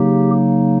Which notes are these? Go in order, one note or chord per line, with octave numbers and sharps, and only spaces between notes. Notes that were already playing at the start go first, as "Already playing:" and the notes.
Already playing: C#3 F#3 A#3 D#4 G4